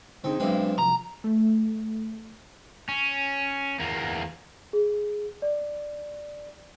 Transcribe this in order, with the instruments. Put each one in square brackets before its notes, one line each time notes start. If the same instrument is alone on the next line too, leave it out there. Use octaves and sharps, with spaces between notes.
[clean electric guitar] D3 D#4 G#4 [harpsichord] C4
[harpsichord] B1 E3 C4 [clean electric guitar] G#3 D4 F5
[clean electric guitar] C2 F3 [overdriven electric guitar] A#5
[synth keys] A3
[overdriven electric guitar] C#4
E2 A#3
[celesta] G#4
D5